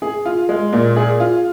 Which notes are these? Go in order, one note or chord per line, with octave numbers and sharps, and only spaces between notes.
G#4
F4
G#3
A#2
G#4
F4